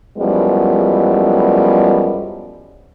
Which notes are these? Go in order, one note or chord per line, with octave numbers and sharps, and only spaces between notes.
F#2 F3 G3 G#3 B3 E4